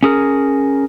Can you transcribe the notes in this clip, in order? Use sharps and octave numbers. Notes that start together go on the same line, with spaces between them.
C#4 G#4 A#4